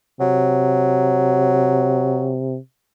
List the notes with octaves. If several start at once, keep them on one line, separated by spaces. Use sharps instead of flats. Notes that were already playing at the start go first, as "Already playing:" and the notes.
C3 F#3